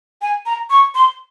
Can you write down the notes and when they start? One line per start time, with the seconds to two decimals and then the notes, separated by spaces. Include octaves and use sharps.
0.22 G#5
0.46 A#5
0.70 C#6
0.95 C6